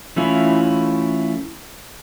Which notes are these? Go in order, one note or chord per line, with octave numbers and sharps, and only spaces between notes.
E3 A3 C#4 E4 F4